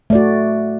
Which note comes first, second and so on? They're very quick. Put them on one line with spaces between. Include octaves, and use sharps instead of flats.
A3 D5 F#4